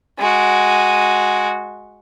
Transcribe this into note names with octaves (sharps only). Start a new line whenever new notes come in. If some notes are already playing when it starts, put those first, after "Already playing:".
G#3 F#4